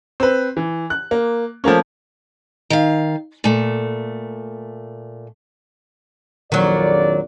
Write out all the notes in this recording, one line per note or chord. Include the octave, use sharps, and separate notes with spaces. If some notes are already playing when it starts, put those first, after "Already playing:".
C4 B4
E3
F#6
A#3
F3 A3 A#3 C#4
D#3 F5
A#2 A3
A#1 F2 D#3 F#3 D5